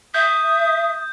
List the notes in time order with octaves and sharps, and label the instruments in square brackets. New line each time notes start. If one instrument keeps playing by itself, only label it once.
[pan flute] E5 [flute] D#6 [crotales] G6